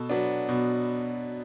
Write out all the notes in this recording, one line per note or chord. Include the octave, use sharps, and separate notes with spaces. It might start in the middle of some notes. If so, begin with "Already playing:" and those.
Already playing: B2 A4 A5
F#3 B3 D4
B2